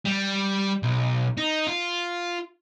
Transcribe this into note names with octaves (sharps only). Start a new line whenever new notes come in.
G3
B1
D#4
F4